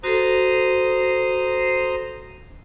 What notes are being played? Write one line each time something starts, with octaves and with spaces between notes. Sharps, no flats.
F#4 A4 C5 A#5 D#6